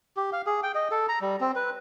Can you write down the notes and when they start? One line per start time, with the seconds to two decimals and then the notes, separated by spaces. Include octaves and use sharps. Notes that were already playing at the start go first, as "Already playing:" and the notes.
0.17 G4
0.33 F5
0.46 G#4
0.63 G5
0.75 D#5
0.91 A4
1.09 A#5
1.21 G3
1.40 C4
1.56 B4